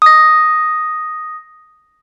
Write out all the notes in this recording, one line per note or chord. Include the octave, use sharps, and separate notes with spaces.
D#6 A#6